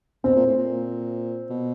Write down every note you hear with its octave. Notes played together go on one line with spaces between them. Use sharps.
B2 C4
A#2
A2
A#2
B2